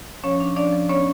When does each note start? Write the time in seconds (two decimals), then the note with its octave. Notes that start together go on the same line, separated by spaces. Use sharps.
0.24 F3 C#4 C#5
0.40 D4
0.56 F3 D4 D5
0.73 F3
0.89 B3 C#4 C#5